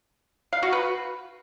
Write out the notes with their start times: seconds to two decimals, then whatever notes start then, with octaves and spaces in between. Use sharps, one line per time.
0.53 F5
0.63 F#4
0.72 B4